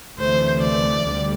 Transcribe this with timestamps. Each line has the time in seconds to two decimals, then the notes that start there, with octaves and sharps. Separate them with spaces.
0.18 D2 C3 E3 A3 C5
0.61 D5
1.04 D2 D3 G3